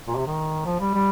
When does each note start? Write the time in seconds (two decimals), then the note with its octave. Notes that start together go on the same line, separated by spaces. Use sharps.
0.08 A#2
0.17 C3
0.27 D#3
0.65 F3
0.80 G3
0.94 G3